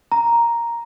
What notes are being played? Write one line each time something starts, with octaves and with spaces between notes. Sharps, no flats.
A#5